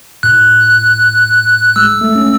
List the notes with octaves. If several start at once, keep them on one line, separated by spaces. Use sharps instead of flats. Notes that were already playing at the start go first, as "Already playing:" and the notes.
A2 F#6
G#3 E6
A3
C#4